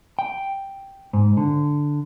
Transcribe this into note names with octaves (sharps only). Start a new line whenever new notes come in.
G5
G#2
D3